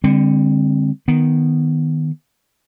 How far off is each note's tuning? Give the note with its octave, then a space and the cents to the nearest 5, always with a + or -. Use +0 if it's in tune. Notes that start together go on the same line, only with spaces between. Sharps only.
D3 +0 G3 +45 C4 +5
D#3 +0 B3 +0